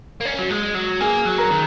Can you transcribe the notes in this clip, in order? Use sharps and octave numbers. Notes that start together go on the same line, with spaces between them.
A#3
C#4
F#3
G#3
F#3
A#3 G#4 G#5
F#3
A#4 A#5
D#3